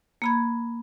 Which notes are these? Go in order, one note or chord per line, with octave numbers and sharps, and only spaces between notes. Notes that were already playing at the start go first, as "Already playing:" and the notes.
A#3 B5 G#6